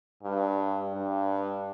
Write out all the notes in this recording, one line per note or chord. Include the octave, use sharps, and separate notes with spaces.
G2
G2